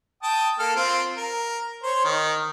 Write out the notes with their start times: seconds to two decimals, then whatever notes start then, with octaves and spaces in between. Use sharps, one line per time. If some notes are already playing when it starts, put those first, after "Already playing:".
0.23 G5 A5 D#6
0.59 A#3 A4 F6
0.76 C4 F4
1.16 A#4
1.83 C5 C#5
2.04 D#3